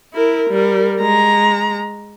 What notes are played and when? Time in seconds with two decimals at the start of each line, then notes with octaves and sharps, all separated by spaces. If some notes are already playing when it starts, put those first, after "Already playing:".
0.14 E4 A#4
0.50 G3 A#4
1.00 G#3 A#5